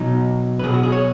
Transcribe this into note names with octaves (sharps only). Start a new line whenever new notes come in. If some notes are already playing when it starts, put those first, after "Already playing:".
Already playing: B2 F#3 D#4
B4
B2 F#3 G#4
F#4
G#4
C#5